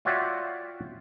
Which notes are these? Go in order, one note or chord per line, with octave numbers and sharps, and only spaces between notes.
F4 F#4 C#5 D5 E5 G5